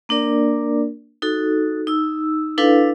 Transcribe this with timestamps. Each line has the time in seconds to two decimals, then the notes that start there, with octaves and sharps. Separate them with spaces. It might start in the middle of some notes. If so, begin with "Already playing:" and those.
0.09 A#3 D4 A#4 D5
1.22 D#4 F#4 A4
1.87 D#4 E6
2.58 D4 E4 A4 B4 F5